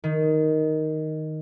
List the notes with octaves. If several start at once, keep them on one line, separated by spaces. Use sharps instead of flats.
D#3